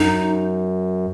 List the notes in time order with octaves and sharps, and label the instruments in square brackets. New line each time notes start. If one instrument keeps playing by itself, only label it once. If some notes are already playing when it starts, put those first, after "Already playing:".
Already playing: [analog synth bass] F#2 [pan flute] D#4